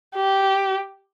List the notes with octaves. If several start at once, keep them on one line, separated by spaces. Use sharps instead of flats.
G4